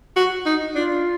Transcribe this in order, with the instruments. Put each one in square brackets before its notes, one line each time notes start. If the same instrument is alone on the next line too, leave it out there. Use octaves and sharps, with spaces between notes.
[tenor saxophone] F#4
D#4
[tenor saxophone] D4 [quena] F4